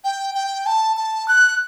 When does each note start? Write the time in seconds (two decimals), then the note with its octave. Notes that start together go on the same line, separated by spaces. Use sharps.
0.04 G5
0.35 G5
0.66 A5
0.97 A5
1.28 F#6